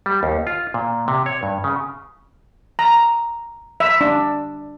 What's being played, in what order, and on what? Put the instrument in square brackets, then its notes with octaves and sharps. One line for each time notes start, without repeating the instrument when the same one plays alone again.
[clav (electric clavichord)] G3
D#2
F4
A#2
C3
C#5
G2
C#3
[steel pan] A#5
E5
D4